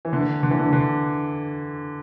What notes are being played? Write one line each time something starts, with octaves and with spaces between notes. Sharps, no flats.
E3
D3
D3
E3
D3
D3